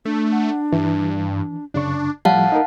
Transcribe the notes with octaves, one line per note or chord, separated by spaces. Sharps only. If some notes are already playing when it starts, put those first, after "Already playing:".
A3 D4
F#5
G2 E3
F#2 C#3 D4 C#6
A2 F3 G3 F5 F#5 A5
D#4 A#4